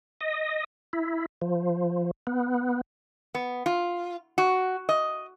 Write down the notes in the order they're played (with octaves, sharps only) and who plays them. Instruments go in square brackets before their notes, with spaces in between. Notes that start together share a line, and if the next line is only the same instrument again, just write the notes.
[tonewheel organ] D#5
E4
F3
B3
[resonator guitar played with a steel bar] B3
F4
F#4
D#5